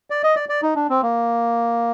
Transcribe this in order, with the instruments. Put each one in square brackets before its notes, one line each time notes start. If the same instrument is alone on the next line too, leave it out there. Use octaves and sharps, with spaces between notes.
[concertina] D5
D#5
D5
D5
D#4
D4
C4
A#3